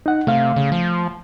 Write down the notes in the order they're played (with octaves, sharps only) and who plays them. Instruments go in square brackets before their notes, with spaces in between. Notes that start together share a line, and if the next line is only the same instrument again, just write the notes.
[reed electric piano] D#4 F#5
[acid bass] C3 [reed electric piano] A3 F5
[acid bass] C#3
F3